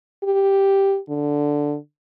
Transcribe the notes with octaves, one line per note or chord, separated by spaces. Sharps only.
G4
D3